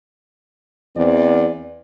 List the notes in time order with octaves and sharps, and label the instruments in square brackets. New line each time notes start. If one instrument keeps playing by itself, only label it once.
[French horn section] E2 C4 D5